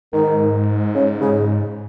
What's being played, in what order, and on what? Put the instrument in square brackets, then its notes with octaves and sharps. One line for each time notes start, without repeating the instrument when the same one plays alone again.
[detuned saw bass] G#2 [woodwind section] D#3
[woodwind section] C#3
C#3